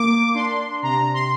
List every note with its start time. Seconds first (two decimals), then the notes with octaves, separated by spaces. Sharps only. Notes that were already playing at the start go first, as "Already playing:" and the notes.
Already playing: A#3 D6
0.34 D4 C6
0.82 C3 A#5
1.13 C6